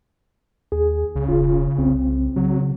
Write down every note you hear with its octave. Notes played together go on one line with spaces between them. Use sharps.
D#2 G#4
C#2 C#3
E1 F4
C2 C4
C#3 F#3